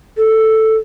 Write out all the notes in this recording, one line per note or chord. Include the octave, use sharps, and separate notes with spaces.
A4